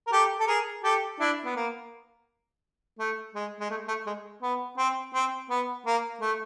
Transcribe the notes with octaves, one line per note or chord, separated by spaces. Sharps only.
A#4
G4 A4
A4
G#4 A#4
G4 A4
D4 E4
B3
A#3
A3
G#3
G#3
A3
A3
G#3
B3
C4
C4
B3
A#3
A3